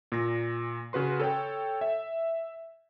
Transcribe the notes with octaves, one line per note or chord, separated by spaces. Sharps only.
A#2 A#6
C#3 F#4 B4 C6
A4 C#5 G5
E5